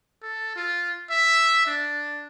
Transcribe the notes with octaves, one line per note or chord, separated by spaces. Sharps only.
A4
F4
E5
D4